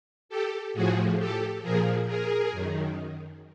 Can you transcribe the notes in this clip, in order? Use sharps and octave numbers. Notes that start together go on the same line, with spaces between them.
G4 A4
A2 F3 F#4 G#4
G4 A4
A#2 F3 G#4 A#4
G#4 A#4
F#2 D#3